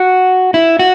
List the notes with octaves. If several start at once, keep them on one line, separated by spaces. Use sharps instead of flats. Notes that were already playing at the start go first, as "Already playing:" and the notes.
Already playing: F#4
E4
F#4